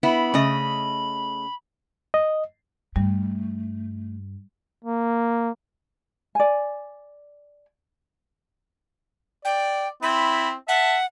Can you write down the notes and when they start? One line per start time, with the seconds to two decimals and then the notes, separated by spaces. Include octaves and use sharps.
0.03 B3 E4 B5
0.34 C#3 A3 D#5
2.14 D#5
2.96 G2 G3 A3
4.84 A#3
6.35 D5 G#5
9.45 D5 G5
10.03 C4 E4 B5
10.68 E5 F#5 A5